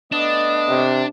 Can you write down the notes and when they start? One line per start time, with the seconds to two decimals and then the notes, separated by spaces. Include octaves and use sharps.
0.12 A3 B3 D4 D#5
0.69 C3